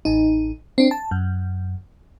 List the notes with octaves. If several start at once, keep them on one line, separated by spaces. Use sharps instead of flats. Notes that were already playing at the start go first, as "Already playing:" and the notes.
A1 D#4
C4 D4
A5
F#2